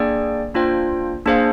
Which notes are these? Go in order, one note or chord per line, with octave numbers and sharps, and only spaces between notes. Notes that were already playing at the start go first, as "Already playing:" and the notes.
Already playing: A#3 D4 G#4 D5 G5
A#3 D4 F4 C5 G5
A#3 D4 G#4 C5 F5